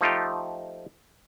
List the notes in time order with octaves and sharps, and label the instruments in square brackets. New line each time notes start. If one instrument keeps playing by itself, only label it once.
[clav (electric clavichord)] F3 A3 D#4 F4 G4